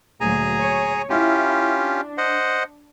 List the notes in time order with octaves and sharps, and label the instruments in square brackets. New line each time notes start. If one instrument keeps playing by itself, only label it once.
[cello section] D2 A#2 F#3 [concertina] G#4 G#5 A#5
[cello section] C#5
[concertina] C#4 F4 G4 [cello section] E4
[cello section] D4
[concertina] C5 D#5 F#5